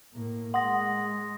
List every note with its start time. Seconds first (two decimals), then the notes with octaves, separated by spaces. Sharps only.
0.13 A2 A#3
0.54 G#3 F#5 C6 D#6 A#6